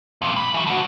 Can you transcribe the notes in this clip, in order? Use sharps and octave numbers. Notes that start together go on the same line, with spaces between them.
F2 A#2
B5
E3 F#3
D3 F#4